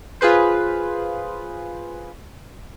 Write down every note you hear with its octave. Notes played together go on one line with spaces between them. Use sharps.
F4 G#4 B4 C5